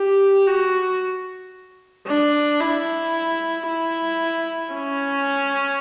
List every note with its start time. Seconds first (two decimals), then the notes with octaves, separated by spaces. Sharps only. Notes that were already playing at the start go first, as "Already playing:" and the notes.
Already playing: G4
0.47 F#4
2.07 D4
2.61 E4
3.67 E4
4.73 C#4